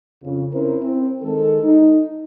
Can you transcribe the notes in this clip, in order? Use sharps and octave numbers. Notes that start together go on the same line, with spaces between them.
F2 C#3
C4 C#4 E4 A#4 C5
C4
D#3 G#3 A4
D#4